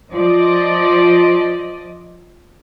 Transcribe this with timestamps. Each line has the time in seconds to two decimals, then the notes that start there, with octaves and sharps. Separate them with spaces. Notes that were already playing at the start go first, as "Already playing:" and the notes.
0.13 F3 D5 D#5